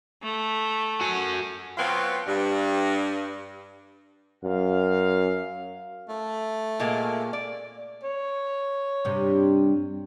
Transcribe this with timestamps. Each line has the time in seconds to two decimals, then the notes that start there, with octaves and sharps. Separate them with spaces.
0.23 A3
1.01 F#4 F#5 G#5
1.78 B2 F#3 B3 C4 F4
2.27 G2
4.44 F#2 F5
6.09 A3
6.80 A#2 G#3 A#3
7.33 D5
8.03 C#5
9.05 G2 C3